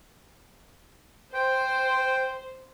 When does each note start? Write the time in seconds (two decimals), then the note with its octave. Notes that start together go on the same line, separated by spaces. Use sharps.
1.34 C5 G5